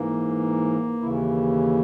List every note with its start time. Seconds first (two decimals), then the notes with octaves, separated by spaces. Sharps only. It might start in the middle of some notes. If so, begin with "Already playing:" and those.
Already playing: G#2 E3 A#3
1.02 D#2 C#3 E3 E4